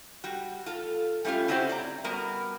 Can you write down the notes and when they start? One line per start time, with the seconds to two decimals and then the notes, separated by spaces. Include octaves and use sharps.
0.24 G3 F#4
0.66 F4 A4
1.25 G3 A3 C#4 D#4 F4
1.48 C4 C#4 E4 F#4 G4 C5
1.69 D5 A#5
2.04 G3 B3 F#4 A#4 A#5